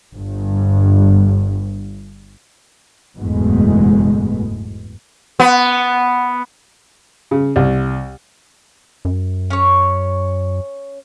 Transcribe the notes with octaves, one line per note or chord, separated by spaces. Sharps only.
G1 G2
F#1 E2 G#2 B2 G#3 A3
B3
C#3
C2
F#2
C#4 C#5